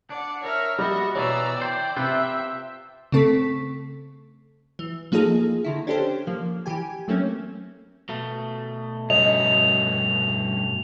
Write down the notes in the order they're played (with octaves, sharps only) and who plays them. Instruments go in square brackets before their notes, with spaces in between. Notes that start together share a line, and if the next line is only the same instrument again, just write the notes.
[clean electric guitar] D4 [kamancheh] D5 F#5
[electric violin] A#4 E5 [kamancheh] C#5 F6
[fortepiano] G3 [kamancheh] F#4 E5 [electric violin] D#5
[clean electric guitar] B2 E3 [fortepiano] C#5 [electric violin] D5 [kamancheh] A#5 E6
[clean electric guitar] E3 C5 [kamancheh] G5
[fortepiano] C3 [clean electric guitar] F4 B4 C5 [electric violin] E5
[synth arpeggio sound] C#3 A3 C4 A4 C#6 B6
E3
F3 A#3 D#4 F4 G#4 A4
[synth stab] D3 D#3 E4
C#4 D4 G4 A4 C5
F3 A#3
E3 G4 G#5
F#3 A3 A#3 C4 C#4
[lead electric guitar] B2 A3
[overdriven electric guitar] G2 C#4 [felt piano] D#5 [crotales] F7